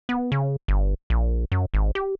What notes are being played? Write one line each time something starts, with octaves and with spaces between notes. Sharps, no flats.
B3
C#3
G1
A#1
F#2
G#1
G4